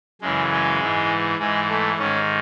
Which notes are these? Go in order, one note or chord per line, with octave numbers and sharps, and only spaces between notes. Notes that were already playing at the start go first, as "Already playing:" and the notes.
F#2 C#3 E3 G#3
G#3
G#2 E3
G#2 E3 G#3
A3
G#2 D#3 C#4